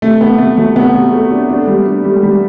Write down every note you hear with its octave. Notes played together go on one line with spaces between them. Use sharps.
C3 A3
C3 B3
C3 A3
F#3 A3
C3 B3
C3
A3
D4
D4
G3
D4
G3
G3